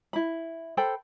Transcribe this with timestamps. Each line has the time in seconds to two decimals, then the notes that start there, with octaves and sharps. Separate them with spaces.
0.13 E4 B5
0.77 A4 C5 G5 B5